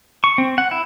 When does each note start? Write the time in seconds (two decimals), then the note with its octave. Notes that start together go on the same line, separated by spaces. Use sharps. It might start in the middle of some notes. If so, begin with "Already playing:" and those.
0.24 C#6
0.38 C4
0.58 F#5
0.71 E4